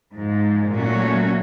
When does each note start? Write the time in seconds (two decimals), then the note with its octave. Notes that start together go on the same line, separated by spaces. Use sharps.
0.15 G#2 F3 G#3
0.72 A#2 F#3 A3 C#4 F#4